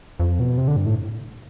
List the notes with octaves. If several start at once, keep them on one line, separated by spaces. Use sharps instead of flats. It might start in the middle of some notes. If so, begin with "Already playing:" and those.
F2
B2
C3
D3
G2
A2